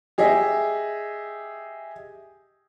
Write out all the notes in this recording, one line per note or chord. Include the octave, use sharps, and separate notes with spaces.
G4 G#4 D#5 E5